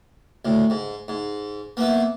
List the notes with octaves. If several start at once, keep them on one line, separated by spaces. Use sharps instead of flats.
D2 A2
G#2
G#2
A#3 B3 E4